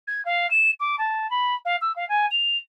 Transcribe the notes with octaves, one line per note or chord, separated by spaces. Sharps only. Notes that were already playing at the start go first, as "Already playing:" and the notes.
G#6
F5
E7
D6
A5
B5
F5
E6
F5
G#5
F7